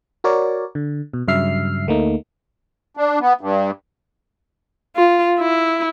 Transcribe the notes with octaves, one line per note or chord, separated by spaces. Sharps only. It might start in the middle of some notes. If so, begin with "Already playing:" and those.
F#4 A#4 C#5 D5
D3
B2
G2 C#3 F#3 E5 F6 C7
D2 A3 A#3 D#4
D4
B3
G2
F4
E4